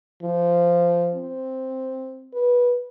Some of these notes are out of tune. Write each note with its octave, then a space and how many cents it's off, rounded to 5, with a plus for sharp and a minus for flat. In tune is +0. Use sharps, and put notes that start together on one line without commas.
F3 -15
C4 +0
B4 -20